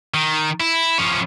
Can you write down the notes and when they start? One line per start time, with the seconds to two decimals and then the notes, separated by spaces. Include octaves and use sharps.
0.14 D#3
0.60 E4
0.98 F3 C#4